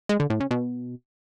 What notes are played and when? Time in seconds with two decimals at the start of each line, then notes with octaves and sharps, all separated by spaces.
0.09 G#3
0.20 D3
0.30 A2
0.40 C#3
0.51 B2